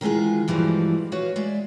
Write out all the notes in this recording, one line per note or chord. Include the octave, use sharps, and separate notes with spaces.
D#3 E3 G#3 F4 G#4
G2 E3 F3 G3 G#3 F#4
F#4 B4 C#5 F5
G#3 D5 E5